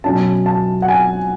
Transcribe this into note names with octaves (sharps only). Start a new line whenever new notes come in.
B2 F#3 C#4 A5
A5
F#5
G#5